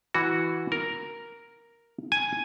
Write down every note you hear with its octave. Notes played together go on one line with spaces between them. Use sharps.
E3 F#4
A#4
G#5